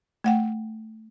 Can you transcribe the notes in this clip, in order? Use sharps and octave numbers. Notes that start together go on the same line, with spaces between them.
A3 F#5 G5